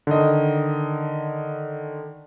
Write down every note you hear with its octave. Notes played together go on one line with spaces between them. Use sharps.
D3 D#3 D#5